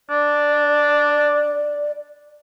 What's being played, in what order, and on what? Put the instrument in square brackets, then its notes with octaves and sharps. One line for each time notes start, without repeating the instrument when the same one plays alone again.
[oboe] D4 [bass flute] D5